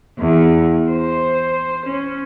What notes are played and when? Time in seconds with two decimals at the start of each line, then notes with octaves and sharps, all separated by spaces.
0.20 E2
0.91 C5
1.86 C#4